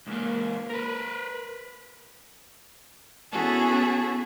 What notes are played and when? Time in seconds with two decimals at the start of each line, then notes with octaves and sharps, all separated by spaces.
0.08 C#2 A#3
0.70 A#4 B4
3.31 B3 C#4 E4 F#4 G#4 A4